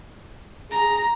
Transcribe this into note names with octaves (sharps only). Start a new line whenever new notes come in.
G#4 A#5